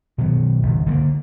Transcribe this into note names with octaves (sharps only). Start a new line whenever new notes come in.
B2 D#3 F#3
G#1 C#2
D3 A3 A#3